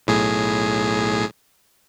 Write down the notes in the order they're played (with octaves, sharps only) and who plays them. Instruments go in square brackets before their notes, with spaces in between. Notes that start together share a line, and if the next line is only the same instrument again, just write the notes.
[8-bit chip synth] B1 A2 G#4